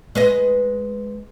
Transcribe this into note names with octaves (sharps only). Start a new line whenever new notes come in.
G#3 B4 D#5